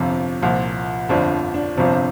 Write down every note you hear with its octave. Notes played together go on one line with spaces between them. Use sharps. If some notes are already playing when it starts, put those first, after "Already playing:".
Already playing: G1 F2 C3 F3
C2 A#2 F3
G1 F2 D3 F3 D4
D4
G1 F2 C3 F3